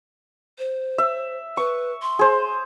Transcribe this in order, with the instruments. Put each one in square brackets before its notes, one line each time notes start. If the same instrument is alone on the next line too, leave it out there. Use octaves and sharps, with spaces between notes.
[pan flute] C5
[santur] E5
[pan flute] B4 [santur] C#6
[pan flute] C6
[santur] G#4 C5